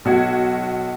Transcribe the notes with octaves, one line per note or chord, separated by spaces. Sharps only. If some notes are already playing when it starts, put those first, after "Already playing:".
B1 F#4 G#6